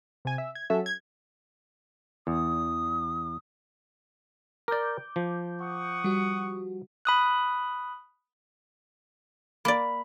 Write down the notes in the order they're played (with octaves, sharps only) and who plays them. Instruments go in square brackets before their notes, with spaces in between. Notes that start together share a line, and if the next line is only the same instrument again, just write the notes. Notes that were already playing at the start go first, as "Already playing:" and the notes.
[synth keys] C3 G#5
E5
G#6
F#3 C#4 F#4 A4 E5
G#6
[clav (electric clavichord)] E2 [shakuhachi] D#6
[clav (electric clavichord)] A#4 D5 [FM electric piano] D6 G6
[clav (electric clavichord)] F3
[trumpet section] F#5 C#6 D#6
[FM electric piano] G3 F#4
[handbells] B5 D#6 F#6
[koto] A#3 D5 [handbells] B5